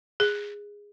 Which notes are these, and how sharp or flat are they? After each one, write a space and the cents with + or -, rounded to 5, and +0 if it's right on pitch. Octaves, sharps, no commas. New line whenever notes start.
G#4 -15